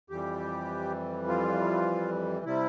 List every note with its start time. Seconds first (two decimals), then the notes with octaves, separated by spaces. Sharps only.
0.10 F2 E3 G3 G4
1.28 F4
2.45 C3 G3 E4